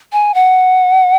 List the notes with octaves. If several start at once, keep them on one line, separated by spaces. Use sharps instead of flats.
G#5
F#5